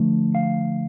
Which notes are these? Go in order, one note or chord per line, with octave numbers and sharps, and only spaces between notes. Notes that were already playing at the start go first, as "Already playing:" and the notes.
Already playing: D3 F3 A3
F5